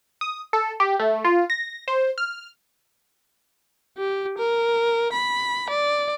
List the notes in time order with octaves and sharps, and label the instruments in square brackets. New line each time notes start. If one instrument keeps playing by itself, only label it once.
[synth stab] D#6
A4
G4
A3
F4
A#6
C5
F6
[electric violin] G4
A#4
B5
D5